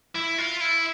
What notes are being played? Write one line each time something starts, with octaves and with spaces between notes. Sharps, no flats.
E4
F4
E4